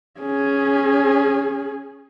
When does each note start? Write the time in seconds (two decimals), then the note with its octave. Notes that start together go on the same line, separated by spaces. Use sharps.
0.20 C#4 G#4